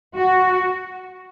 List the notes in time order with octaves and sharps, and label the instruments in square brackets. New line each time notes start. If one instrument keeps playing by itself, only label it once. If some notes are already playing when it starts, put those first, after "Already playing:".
[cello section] F#4